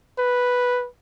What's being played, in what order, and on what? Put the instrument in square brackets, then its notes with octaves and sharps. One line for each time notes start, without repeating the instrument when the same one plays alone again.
[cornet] B4